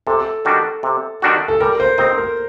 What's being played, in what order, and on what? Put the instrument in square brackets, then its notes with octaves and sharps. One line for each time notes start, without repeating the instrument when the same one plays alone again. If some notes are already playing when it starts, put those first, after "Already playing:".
[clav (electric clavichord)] C3 [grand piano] A4
[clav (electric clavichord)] D#3 G3 D4 F#4
C3
D#3 G3 D4 F#4
[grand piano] A4
[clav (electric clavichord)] G3 [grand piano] A#4
[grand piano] C5
[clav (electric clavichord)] C4 D#4 [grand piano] C5
[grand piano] A#4